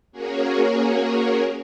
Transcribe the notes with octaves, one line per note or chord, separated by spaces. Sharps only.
A#3 C#4 F#4 G#4 A#4 C#5